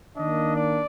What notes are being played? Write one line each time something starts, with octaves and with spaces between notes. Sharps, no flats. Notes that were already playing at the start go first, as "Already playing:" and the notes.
D#3 A#3 D4 D#5
D5